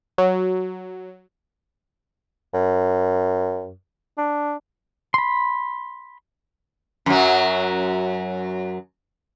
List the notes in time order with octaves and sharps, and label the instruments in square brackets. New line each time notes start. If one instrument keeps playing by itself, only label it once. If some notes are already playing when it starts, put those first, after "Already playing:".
[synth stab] F#3
[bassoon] F#2
D4
[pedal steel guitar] B5 C6
[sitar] F#2 F#3